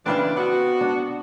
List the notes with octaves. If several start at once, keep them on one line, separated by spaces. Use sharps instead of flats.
C#3 E3 C4 D4 B4 F5
B3 F#4
D4